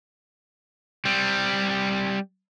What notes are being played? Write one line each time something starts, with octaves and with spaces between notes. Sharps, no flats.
G3 C4